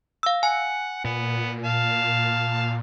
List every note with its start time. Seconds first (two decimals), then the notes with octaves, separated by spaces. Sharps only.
0.23 F5 E6
0.43 F#5 G#5
1.04 A#2 B3
1.64 F5 A5